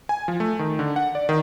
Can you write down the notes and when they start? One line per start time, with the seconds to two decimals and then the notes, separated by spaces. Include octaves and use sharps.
0.09 G#5
0.28 F3
0.40 A3
0.59 D#3
0.79 D3
0.96 F#5
1.15 D5
1.29 D#3